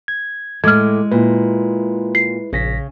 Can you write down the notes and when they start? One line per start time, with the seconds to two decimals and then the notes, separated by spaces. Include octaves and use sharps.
0.08 G#6
0.64 A2 G#3 A4 D6 F6 G#6
1.12 A#2 E4 B4
2.15 C7
2.53 A#1 C#3 A#6 B6